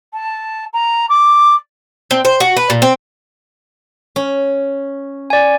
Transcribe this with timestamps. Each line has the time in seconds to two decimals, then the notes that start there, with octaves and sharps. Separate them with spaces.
0.13 A5
0.73 A#5
1.09 D6
2.11 C4
2.25 C5
2.40 F#4
2.57 B4
2.70 A#2
2.82 C4
4.16 C#4
5.30 D5 G#5